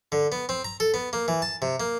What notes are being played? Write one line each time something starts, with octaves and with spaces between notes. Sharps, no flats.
D3
B3
C4
A#5
A4
B3
A#3
E3
A5
C3
A#3